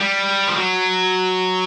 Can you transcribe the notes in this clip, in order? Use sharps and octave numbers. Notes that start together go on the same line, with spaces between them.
G3
F3
F#3